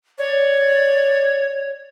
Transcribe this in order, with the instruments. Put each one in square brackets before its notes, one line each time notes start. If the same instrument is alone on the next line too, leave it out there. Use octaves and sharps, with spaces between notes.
[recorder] C#5 [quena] D5